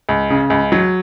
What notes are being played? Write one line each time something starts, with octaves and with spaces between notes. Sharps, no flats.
C#2
C#3
C#2
F#3